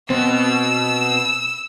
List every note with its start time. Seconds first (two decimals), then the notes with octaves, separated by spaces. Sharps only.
0.10 B2 C4 E6